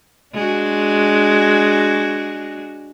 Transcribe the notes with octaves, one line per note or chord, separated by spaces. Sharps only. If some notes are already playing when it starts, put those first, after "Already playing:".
G#3 D4 F#4